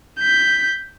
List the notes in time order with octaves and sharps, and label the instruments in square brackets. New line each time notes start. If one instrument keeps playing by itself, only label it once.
[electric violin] G6 B6